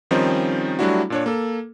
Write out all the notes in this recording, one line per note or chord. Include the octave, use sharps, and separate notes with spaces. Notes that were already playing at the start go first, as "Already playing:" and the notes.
D#3 F3 G3 C4 C#4 D#4
F#3 G3 A3 D4 E4 F#4
A#2 D4 C#5
A#3 A4